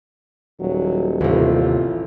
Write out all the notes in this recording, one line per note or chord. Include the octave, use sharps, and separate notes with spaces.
D#1 F#3
A1 D#2 C3 F4